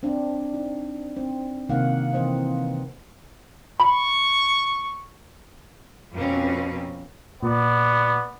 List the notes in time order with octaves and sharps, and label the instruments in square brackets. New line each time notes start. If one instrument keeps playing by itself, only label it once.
[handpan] C4 D4
D#4
C4
C3 D#3 A#3 D#4 F5 F#5
E3 C4 C5 D#5
[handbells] B5 [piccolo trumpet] C#6
[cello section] F2 B2 A#3 C4 C#4
[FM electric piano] A#2 [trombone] B3 [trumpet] D5